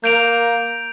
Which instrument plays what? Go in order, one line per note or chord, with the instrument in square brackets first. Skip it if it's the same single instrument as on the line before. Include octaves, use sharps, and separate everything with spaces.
[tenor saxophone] A#3 [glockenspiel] G6 D7 F7